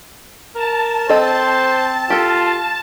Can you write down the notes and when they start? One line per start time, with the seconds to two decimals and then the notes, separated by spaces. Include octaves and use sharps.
0.55 A#4 A5
1.09 C4 A4 C5 D#5
2.10 F4 G4 A4